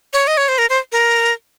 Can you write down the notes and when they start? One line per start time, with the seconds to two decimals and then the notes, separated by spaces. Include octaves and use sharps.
0.13 C#5
0.27 D#5
0.37 C#5
0.48 C5
0.58 A#4
0.70 C5
0.92 A#4